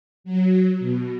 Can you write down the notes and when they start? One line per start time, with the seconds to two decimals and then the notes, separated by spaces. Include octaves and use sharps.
0.24 F#3
0.79 B2